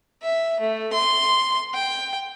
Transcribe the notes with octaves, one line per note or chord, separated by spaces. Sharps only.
E5
A3
C6
G5